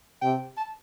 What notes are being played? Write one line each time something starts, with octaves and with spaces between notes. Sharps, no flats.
C3 G5
A5